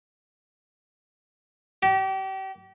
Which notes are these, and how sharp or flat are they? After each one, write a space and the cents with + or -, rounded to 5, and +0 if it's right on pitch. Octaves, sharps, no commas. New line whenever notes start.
G4 -35